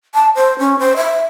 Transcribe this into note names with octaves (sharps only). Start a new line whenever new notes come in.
A5
C5
C#4
C5
E5